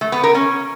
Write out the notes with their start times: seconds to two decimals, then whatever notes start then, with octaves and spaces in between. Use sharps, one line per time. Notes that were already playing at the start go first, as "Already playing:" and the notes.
0.01 A3
0.12 B3
0.23 A#4
0.35 C#4